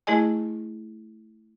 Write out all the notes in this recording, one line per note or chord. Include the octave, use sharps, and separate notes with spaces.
A3 E4 G#4 D#5 G#5